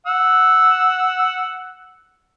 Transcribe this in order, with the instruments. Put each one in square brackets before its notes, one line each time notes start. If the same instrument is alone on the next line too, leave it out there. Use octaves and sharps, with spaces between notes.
[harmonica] F#5 E6